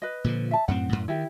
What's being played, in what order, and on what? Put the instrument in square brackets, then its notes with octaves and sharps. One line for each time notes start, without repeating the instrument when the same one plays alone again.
[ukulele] B4 D#5
[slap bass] A#2 D3 F3
[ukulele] E5 A5
[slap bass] F#2 A2 C4 [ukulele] F#5
[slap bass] F#2 A2
[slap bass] D#3 [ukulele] E4 G4